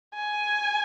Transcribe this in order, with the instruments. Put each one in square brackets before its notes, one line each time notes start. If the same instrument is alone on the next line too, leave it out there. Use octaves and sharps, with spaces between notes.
[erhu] G#5